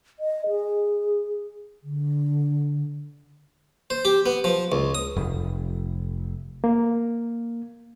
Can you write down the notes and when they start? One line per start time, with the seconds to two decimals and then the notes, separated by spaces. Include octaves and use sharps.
0.20 D#5
0.48 G#4
1.83 D3
3.90 C5
4.05 G4
4.26 B3
4.44 F3
4.72 C#2
4.95 D#6
5.16 F1
6.64 A#3